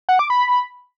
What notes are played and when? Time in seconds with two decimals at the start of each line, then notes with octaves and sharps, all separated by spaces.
0.09 F#5
0.19 D6
0.30 B5